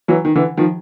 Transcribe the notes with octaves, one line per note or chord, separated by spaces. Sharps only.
E3 F#3
D#3
D3 E3
D#3 F3